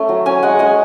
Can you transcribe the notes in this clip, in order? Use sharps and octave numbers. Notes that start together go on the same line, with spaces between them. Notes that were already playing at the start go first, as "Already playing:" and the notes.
Already playing: A3 C#4
F#3
C#4 G#5
G#3 F#5
G#3 G#5